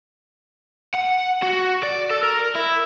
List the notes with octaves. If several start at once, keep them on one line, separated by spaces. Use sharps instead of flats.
F#5
F#4
D5
A4
A#4
E4